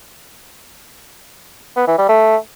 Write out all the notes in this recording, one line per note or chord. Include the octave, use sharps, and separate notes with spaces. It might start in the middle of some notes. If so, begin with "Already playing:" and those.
B3
E3
G3
A3